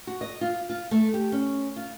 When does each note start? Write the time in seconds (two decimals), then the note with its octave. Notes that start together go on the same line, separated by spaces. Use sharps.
0.07 F#4
0.21 D#5
0.41 F4
0.69 F4
0.91 A3
1.14 G4
1.32 C#4
1.76 F4